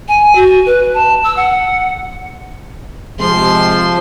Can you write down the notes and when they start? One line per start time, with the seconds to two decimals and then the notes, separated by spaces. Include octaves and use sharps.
0.08 G#5
0.35 F#4
0.66 B4
0.94 A5
1.24 E6
1.37 F#5
3.19 C3 F3 G#3 C6